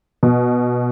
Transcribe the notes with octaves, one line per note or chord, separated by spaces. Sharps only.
B2